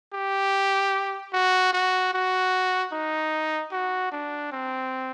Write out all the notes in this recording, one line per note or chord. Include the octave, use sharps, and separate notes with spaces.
G4
F#4
F#4
F#4
D#4
F#4
D4
C4